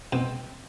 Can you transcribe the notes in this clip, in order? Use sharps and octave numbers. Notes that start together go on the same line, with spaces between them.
B2 C4